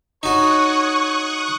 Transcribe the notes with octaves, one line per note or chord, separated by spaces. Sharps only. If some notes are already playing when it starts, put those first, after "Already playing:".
D#4 F#4 C#5 C#6 D#6 F#6